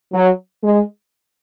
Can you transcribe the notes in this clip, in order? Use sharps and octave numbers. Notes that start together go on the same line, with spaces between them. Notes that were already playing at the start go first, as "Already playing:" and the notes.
F#3
G#3